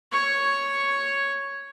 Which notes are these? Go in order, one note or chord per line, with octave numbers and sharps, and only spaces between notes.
C#5 C#6